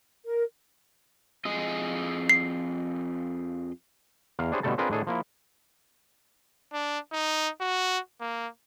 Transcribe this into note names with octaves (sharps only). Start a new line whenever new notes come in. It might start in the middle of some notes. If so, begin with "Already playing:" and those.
A#4
F2 G#4 D#5
C7
E2 F5
D4 E4 G4 G#4 C5 C#5
B2 D3 G3 A3 A4 A5
C4 D4 F4 G#4 A#4 B4
A2 D#3 D4 G#4 A4
F3 A#3 E4
D4
D#4
F#4
A#3